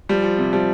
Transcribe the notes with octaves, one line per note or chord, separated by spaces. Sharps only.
F3 G3
F3
C3
F3 G3